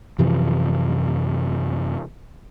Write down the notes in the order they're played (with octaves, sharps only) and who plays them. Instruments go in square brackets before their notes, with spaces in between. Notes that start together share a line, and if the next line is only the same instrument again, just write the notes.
[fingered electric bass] F#2 C3 E3 F3